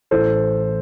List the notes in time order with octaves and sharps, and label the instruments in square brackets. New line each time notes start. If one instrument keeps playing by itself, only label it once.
[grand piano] A1 A2 E3 A4 C5